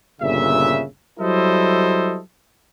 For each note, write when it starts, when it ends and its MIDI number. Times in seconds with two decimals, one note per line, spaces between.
0.21 0.84 31
0.21 0.84 46
0.21 0.84 49
0.21 0.84 76
1.19 2.19 54
1.19 2.19 55
1.19 2.19 64
1.19 2.19 69
1.19 2.19 72
1.19 2.19 75